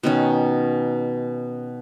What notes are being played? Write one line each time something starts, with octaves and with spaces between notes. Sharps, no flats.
B2 D#3 C#4